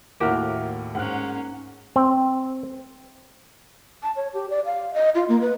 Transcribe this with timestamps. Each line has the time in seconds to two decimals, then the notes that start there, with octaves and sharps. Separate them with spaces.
0.20 D#2 A2 A#3 E4 F#4 G4 A#4 F6
0.95 G#2 A#3 C#4 F#5 F6 F#6
1.96 C4
4.03 A5
4.16 C#5
4.33 G4
4.50 D5
4.65 F5
4.94 D#5
5.15 F4
5.28 A#3
5.41 B4